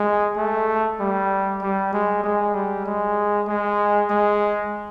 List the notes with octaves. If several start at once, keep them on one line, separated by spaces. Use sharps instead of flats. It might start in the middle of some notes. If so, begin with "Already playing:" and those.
Already playing: G#3
A3
G3
G3
G#3
G#3
G3
G#3
G#3
G#3